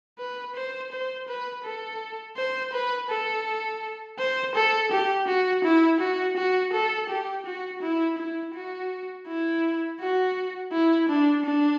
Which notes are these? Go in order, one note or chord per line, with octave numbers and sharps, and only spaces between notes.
B4
C5
C5
B4
A4
C5
B4
A4
C5
A4
G4
F#4
E4
F#4
F#4
A4
G4
F#4
E4
E4
F#4
E4
F#4
E4
D4
D4